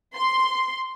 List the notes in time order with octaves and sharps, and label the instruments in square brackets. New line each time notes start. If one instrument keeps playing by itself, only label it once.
[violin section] C6